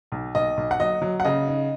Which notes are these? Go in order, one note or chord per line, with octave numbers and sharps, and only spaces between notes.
B1
B1 D#5
B1
F#5
F#3 D#5
F#3
F#5
C#3 D#5
D#4